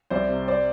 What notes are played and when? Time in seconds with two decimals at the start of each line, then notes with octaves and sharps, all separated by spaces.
0.10 C2 C5 D5
0.29 C3
0.48 C5 D5